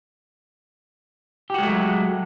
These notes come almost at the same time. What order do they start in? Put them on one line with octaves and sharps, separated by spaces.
G4 F#4 G#3 A3 F#3